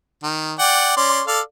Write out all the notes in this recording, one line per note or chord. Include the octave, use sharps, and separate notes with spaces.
D#3
D5 F#5 G5
C#4 D5 C6
A4 D5 F5